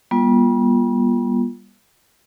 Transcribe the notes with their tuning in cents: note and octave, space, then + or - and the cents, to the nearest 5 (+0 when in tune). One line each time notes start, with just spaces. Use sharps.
G3 +10 B3 -40 F4 +0